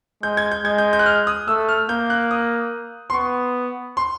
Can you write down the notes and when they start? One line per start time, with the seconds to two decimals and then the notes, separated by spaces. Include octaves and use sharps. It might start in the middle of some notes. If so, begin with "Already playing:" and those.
0.23 G#3 G6
0.37 G#6
0.51 G6
0.65 G#3 G#6
0.78 G6
0.93 G6
0.99 F#6
1.06 F6
1.27 D#6
1.48 A3 E6
1.69 F6
1.89 A#3 G6
2.10 F#6
2.31 D#6
3.10 C6
3.13 B3 C#6
3.97 C6